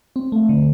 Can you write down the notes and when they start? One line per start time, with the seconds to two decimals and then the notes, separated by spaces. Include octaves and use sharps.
0.16 C4
0.32 A3
0.49 D3